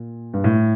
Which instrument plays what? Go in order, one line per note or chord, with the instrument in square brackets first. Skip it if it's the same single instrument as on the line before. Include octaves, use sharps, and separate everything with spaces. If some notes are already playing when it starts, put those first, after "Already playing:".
Already playing: [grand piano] A#2
G2
A2